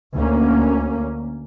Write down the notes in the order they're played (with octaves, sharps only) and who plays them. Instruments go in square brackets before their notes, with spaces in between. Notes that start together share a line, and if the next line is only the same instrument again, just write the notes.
[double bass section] D2 A#3 C#4